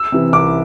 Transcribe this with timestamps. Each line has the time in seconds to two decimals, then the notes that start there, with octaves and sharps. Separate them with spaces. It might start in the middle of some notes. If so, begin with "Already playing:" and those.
Already playing: E6
0.12 C3 E3
0.33 C2 D6